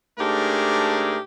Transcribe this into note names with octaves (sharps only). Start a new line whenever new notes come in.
G#2 A3 D4 G4 G#4 A#4